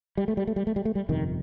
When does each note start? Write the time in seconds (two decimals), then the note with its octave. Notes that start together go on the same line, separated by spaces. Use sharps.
0.17 G3
0.28 A3
0.37 G3
0.47 A3
0.56 G3
0.67 A3
0.76 G3
0.85 A3
0.95 G3
1.09 G1 F2 C3 D#3